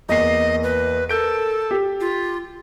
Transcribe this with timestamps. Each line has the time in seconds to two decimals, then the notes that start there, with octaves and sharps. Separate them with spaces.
0.09 E2 A#3 D#5 C7
0.63 B4
1.09 A4 A#4 G6 D7
1.71 G4
2.00 F4